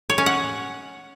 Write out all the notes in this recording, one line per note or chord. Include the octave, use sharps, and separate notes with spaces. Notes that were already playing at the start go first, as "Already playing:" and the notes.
C#5
C#4
F#5